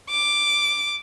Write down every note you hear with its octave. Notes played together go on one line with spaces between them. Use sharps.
D6